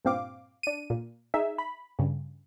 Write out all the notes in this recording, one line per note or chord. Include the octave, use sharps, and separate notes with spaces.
G2 A#2 C4 F5 D6
D4 D#7
A#2
D#4 G#4 E5
B5
G2 C#3